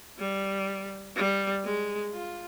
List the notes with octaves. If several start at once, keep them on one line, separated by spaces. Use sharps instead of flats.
G3
G3
G#3
F4